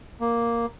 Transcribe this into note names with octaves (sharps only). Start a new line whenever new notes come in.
A#3